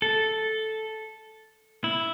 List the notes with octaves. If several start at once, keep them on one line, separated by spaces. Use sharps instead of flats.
A4
E4